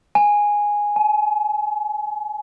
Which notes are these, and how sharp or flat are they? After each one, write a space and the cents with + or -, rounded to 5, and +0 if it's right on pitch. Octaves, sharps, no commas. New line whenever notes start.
G#5 -5
G#5 +40